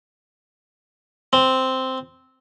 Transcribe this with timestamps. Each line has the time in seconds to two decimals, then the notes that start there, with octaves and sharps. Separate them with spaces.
1.33 C4